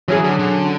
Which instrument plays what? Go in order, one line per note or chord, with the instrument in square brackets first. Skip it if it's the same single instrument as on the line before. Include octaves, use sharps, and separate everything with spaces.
[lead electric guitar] E3 [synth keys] F#3 C#4 G#4
[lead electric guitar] D3
D3